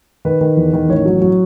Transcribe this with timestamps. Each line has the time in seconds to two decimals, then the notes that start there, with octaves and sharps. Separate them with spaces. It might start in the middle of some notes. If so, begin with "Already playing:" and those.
0.25 D#3 B4
0.41 D#3
0.57 E2
0.73 D#3
0.89 A1 C#5
1.05 F#3
1.22 F#3